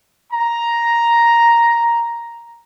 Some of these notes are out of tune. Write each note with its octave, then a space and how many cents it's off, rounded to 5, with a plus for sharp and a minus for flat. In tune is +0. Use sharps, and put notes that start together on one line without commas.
A#5 +5